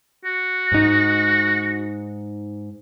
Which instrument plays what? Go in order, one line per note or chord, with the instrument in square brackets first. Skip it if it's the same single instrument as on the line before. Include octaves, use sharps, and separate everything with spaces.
[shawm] F#4
[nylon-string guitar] G#2 D#4